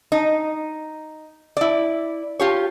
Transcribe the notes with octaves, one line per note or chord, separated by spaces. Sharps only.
D#4
E4 D5
F4 G4 C#5